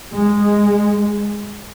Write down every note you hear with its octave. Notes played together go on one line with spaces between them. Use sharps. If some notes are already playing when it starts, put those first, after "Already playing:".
G#3